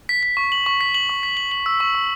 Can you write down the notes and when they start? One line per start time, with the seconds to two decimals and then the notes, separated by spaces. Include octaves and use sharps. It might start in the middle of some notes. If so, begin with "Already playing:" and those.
0.09 B6
0.23 B6
0.37 C#6
0.52 F#7
0.66 C#6
0.81 B6
0.94 F#7
1.09 C#6
1.23 B6
1.37 F#7
1.52 F#7
1.66 E6
1.80 C#6
1.95 C#6